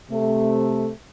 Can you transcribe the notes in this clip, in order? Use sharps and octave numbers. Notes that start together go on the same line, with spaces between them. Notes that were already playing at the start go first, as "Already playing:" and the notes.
C3 A3